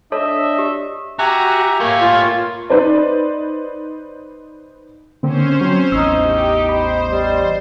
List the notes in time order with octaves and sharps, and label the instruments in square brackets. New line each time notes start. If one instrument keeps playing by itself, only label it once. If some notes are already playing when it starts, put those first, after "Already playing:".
[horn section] D4 E5 [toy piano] A4 C#5 A5 [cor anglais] D#5
[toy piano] G4
[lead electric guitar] F#4 [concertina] G4 E5 G#5 [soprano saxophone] A#5
[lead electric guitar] A3 C#5 [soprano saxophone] A#3
[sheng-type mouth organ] F4
[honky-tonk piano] D#4 B4 C5 D5
[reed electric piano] D3 A#3 C4 [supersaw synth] C#4 C5
[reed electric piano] F#3 C4
[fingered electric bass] A1 E2 [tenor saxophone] D#4 [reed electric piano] E6
[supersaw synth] G4
[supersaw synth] C5 [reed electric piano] D#5 B5
[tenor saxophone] G3 [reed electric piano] D#5